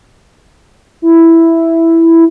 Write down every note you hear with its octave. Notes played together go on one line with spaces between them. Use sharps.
E4